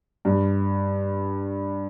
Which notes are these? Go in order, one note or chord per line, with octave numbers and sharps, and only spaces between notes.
G2